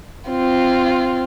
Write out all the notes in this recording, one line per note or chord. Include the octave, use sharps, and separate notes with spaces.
C4 F4